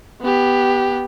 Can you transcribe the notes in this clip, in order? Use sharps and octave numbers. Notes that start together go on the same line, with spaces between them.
B3 G4